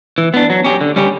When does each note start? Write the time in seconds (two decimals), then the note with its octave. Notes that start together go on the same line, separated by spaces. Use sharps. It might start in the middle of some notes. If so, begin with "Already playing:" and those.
0.18 E3
0.34 B3 D4
0.50 F#3
0.64 C#4 G4
0.81 D3
0.96 G3 C#4 G4